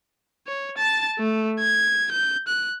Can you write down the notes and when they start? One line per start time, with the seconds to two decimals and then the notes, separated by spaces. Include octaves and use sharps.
0.47 C#5
0.78 A5 A6
1.19 A3
1.60 G#6
2.12 G6
2.48 F#6